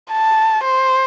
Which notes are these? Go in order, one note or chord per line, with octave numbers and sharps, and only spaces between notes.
A5
C5